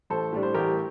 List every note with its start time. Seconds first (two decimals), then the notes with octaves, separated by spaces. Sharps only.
0.10 A1 A4 C5
0.33 A2 G3 D4
0.43 C5
0.54 A1 G4 A#4